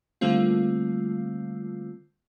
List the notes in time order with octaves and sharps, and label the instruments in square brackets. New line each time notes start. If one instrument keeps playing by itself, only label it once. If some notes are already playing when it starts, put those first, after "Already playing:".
[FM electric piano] D3 G3 A3 A#3 C4 F4